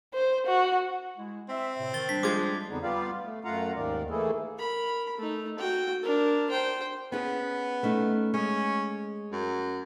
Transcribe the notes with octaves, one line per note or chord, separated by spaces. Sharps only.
C5
F#4
G#3 E4
C4 E5
A2 C3
D#3 A6 G7
G3 D4 B6
F3 G#3 D6 G#6
F2 D3 B3 D4 D#4
G3 B3 F4 G4 D5 F5
A3
F#2 A3 F4 F5 F#5 A#5
D#2 G#2 D#3 A#4 D5
E3 A3 A#3 E4 G#4 A4
A#4 B5
A3 D#4
F#4 G5
D4 A#4
C5 G5
B3 C#4 G#4
A3 C#4 D#4
G#3 C#4
F#2